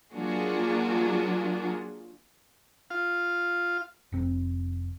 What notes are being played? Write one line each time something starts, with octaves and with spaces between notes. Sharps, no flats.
F#3 A#3 D4 F4 F#4 G#4
F4 F5
F1 C4